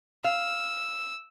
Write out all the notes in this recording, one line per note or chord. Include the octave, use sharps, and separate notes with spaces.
F5 E6